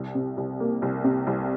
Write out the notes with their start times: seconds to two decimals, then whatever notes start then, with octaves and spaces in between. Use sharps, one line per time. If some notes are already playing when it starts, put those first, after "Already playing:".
Already playing: C2
0.15 C3
0.37 C2
0.60 A#3
0.82 C2
1.04 C3
1.27 C2